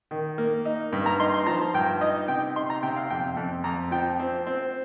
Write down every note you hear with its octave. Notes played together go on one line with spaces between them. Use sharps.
D#3
A#3
D#4
G2
A#5
D#4 C6
C6
F3 A#5
G2 G5
D#4 D#5
C3 G5
D#4 C6
A#5
C3 G5
F5
F2 G5
F2
F2 A#5
F3 G5
C4
C4